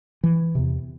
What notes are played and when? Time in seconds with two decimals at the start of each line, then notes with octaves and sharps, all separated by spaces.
0.23 E3
0.55 E2 C3